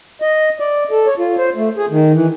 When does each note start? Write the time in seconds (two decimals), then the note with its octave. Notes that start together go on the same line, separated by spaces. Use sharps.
0.22 D#5
0.60 D5
0.91 A4
1.07 C#5
1.19 F4
1.38 C5
1.56 A3
1.77 G#4
1.90 D#3
2.14 E3